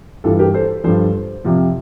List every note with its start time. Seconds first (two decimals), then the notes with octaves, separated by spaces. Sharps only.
0.24 G2 E3 F4 A4
0.39 G4 A#4
0.54 A4 C5
0.84 G2 F3 A4 C5
1.44 F2 C3 F3